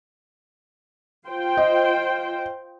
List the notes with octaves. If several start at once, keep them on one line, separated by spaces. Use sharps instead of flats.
F4 C5 G5
D#5